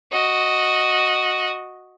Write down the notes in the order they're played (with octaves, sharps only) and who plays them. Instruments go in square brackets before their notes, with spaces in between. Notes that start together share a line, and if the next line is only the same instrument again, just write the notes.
[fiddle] F#4 D#5